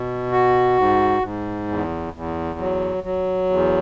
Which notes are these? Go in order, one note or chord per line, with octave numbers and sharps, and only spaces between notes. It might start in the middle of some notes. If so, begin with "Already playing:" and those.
Already playing: B2
F#4
G#2
G#2
E2
E2
F#3
F#3
E2